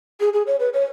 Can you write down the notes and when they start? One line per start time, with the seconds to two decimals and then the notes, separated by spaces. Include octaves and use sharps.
0.20 G#4
0.33 G#4
0.47 C#5
0.60 B4
0.74 C#5